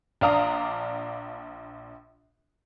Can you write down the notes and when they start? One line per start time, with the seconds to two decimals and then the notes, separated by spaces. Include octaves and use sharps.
0.21 A#1 D4 F5 A#5 D#6